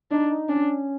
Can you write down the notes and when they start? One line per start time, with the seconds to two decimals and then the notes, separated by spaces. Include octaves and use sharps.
0.11 D4 D#4
0.30 D#4
0.49 C#4 D4